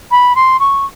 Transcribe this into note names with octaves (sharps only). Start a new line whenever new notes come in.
B5
C6
C#6